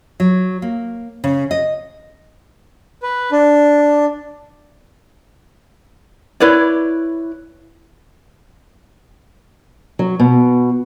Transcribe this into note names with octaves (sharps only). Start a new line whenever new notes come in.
F#3
A#3
C#3
D#5
B4
D4
E4 B4 C#5 D5
F#3
B2